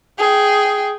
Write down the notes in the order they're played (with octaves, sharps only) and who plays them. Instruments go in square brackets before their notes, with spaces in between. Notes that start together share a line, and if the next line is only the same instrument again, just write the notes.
[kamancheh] G#4 G5